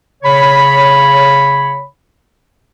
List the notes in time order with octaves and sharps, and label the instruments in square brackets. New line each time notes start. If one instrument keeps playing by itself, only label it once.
[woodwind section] C#3 C#5 B5